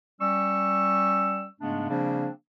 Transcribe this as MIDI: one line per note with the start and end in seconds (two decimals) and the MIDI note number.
0.20 1.46 55
0.20 1.46 61
0.20 1.46 85
0.20 1.46 88
1.61 1.87 44
1.61 1.87 49
1.61 1.87 56
1.61 1.87 57
1.61 1.87 59
1.61 1.87 62
1.89 2.28 49
1.89 2.28 53
1.89 2.28 55
1.89 2.28 58
1.89 2.28 60
1.89 2.28 62